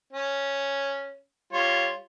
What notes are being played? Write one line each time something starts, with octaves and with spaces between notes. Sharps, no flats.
C#4
G3 F4 C#5